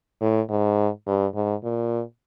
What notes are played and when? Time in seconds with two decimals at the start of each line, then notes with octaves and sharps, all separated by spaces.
0.21 A2
0.49 G#2
1.07 G2
1.35 G#2
1.63 A#2